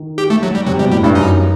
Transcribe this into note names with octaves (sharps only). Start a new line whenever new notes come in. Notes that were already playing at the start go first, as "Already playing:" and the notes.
Already playing: D#3
G4
A3
F#3
G3
C3 F#3
B2 G3
A2 G3
G2 A3
F#2 D#4